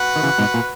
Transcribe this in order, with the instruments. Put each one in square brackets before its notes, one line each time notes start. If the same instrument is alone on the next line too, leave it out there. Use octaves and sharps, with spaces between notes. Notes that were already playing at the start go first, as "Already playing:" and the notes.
Already playing: [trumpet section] F#4 B4 F#5
[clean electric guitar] D#3
C#3 E3
G#2 B2
A#2